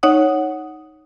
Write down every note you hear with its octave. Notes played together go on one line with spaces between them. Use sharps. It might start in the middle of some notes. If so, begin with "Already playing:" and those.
D#4 C#5 F#5 D#6